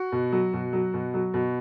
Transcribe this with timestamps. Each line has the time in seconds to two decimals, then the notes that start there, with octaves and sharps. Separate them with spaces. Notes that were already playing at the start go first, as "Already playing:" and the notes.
Already playing: F#4
0.12 B2
0.32 F#3
0.53 B2
0.73 F#3
0.94 B2
1.14 F#3
1.34 B2